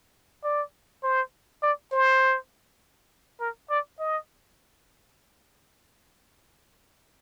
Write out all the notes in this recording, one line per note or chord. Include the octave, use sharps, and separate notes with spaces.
D5
C5
D5
C5
A#4
D5
D#5